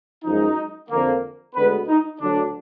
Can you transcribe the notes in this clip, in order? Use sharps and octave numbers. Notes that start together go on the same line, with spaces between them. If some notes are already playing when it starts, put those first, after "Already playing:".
F#2 F3 G#3 D#4
F2 D3 F3 A#3
D2 D3 G#3 B3 B4
D#4
D2 D3 F#3 D4